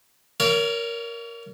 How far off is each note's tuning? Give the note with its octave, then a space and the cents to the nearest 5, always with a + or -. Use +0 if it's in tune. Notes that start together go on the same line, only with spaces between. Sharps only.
A#4 +0 C#5 +35 F5 -30